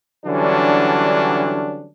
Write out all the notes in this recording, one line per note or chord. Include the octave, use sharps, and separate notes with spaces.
D3 E3 F#3 G3 C#4 D4